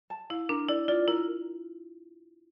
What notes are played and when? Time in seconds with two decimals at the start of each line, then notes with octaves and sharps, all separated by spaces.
0.10 A5
0.30 E4 F5
0.49 D4 A#4
0.68 E4 D5
0.88 F4 D5
1.07 E4 A#4